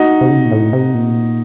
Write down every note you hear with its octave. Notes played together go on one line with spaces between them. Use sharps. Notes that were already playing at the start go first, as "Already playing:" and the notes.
Already playing: D#4 F#4
C3
C#3
C3
A#2
A2
C3
A#2